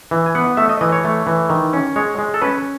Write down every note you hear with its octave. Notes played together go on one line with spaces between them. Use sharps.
E3
G#5
B3 F#5
A3 E5
D#5
E3 D#5
C#5
A3
E3
D#3
C#4
G#3 C#5
G#3
A4
C#4 B4